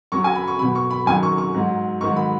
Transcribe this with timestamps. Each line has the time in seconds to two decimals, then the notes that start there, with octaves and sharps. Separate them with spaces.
0.12 F#2 F#3 C#6
0.24 G#5
0.35 B5
0.48 C#6
0.59 B2 F#3 B5
0.75 C#6
0.91 B5
1.06 F#2 D#3 F#3 G#5
1.23 C#6
1.38 C#6
1.54 G#2 F#3
2.01 G#2 D#3 F#3 C#6
2.16 B5